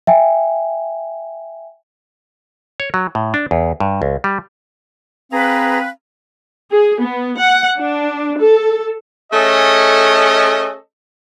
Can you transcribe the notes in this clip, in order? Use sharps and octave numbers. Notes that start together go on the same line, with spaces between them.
E5 G5 G#5
C#5
F#3
A2
D4
E2
G2
C#2
G3
C4 G#4 B4 F5 A#5
G#4
B3
F#5
D4
A4
A3 C#4 G#4 A4 D#5